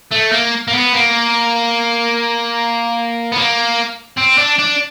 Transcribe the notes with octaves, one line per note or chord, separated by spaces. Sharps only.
A3
A#3
A#3
B3
A#3
B3
A#3
C4
D4
D4